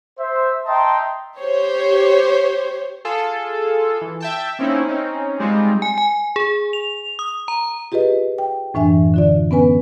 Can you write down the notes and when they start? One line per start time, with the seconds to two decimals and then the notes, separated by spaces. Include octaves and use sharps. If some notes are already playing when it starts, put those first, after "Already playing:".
0.18 C5 E5
0.66 D#5 E5 G5 A5 A#5 C6
1.38 G4 C5 C#5
3.05 F4 G#4 A4
4.01 E3
4.20 E5 G5 A5
4.59 A#3 C4 C#4 D#4 E4
4.88 C4 C#4 D#4
5.39 G3 G#3 C4 D#4 F4
5.82 G#5
5.98 G#5
6.36 G#4
6.73 F7
7.19 D#6
7.48 A#5
7.92 F4 G4 G#4 B4 D#5
8.38 G5
8.74 F#2 A2 E3 D4 E5 G#5
9.14 D3 F4 D5
9.51 B3 C#4 B4 G#5